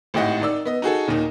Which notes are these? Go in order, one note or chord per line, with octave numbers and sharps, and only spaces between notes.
G#1 A2 G4 D#5 F#5
D#3 D#4 D5 E6
B3 D#5
D#4 F#4 G#4 A4
D#2 A#2 D#3 D#4